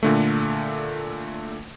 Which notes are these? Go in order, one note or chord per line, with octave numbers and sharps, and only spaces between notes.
A#2 D3 A3